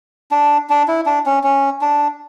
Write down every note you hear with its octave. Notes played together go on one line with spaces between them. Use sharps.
D4
D4
E4
D4
C#4
C#4
D4